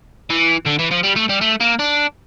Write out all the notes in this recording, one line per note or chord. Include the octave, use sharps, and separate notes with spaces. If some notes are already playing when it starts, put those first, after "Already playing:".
E3
D3
E3
F3
G3
A3
G3
A3
A#3
D4